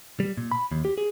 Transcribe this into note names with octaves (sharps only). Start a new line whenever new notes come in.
G3
A#2
B5
D#2
G4
G#4